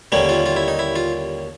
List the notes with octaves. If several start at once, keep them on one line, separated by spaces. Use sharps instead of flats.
D#2 D3 G3 A#3 C#4
F4
F4
E4
D#4
E4
F4